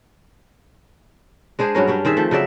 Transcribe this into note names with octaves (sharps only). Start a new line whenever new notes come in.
G#3 D4 G#4 C5
G2 F#3 C#4 A#4
G3 C#4 D4
D#3 C4 G#4 E5
F3 A3
C#3 F#3 D5 E5